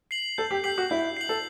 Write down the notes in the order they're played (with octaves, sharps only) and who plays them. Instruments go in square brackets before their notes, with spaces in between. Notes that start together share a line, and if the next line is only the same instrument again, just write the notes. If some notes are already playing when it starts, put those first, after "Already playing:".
[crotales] C7 F#7
[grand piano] A4 [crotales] G6
[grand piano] G4
[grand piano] G4 [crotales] C7 F#7
[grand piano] F#4
[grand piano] E4 [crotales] G6
[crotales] C7 F#7
[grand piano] A4